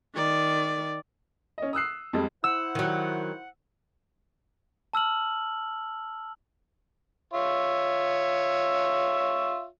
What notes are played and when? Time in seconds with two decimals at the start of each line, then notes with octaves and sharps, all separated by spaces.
0.15 D#3 D5
1.58 C#4 D#5
1.73 D#6 E6 F#6 C7
2.13 F2 G3 G#3
2.44 E4 C5 F#5 E6
2.75 D#3 F#3
4.93 A5 E6 F6 F#7
7.33 F4 C#5 E5